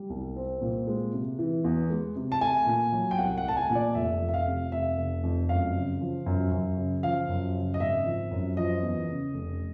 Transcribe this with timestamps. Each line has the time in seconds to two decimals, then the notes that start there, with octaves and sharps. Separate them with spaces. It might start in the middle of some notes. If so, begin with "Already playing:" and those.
Already playing: G3
0.10 C2
0.36 C4
0.62 A#2
0.87 G#3
1.13 C3
1.39 E3
1.64 E2
1.90 G#3
2.16 C3
2.32 A5
2.41 A3 G#5
2.66 A#2
2.92 F#3
3.11 G5
3.18 C2 F#5
3.38 F#5
3.43 A3 A5
3.57 G#5
3.70 A#2
3.75 D5
3.95 F1 E5
4.21 F2
4.28 E5
4.34 F5
4.46 C3
4.72 F1 E5
4.97 F1
5.23 F2
5.49 F#2 F5
5.75 C#3
6.01 F3
6.26 F#2
6.52 F#2
6.77 C#3
7.03 F3 F5
7.29 F#2
7.55 C#3
7.74 D#5
7.80 G#1 E5
8.05 F3
8.31 F#2
8.57 F3 D#5
8.83 E2
9.09 C#3
9.34 F1